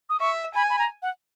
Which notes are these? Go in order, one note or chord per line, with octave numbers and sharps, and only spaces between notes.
D#6
E5 C#6
G#5 B5
B5
A#5
F#5